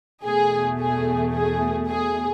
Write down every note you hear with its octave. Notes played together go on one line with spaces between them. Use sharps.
E2 B2 A3 G#4
G#4
G#4
G#4